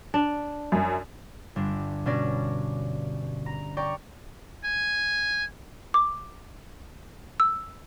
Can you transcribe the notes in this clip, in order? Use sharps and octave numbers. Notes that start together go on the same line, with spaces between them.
D4
F#2
G1 D4
B2 C#4 D4 D5 A#6
A#5
D5 G5 A#5 C#6
G#5
D6
E6